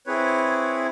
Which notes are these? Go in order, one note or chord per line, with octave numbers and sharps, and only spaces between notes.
C4 E4 G#4 B4 C#5